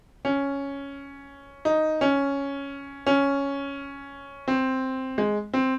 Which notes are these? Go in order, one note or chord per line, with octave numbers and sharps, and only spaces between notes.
C#4
D#4
C#4
C#4
C4
G#3
C4